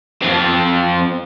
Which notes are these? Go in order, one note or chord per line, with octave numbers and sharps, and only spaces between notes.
F2 C4